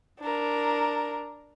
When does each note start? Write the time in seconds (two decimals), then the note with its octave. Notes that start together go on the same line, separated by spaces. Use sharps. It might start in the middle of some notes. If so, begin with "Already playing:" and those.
0.20 D4 A#4